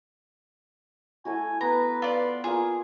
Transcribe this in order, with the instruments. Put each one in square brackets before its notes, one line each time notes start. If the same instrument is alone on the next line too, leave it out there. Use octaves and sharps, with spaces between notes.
[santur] A3 E4 F#4 [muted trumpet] G#5
[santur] B3 [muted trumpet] B4 [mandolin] A#5
[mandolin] F4 D5
[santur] A#3 F4 [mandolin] G#4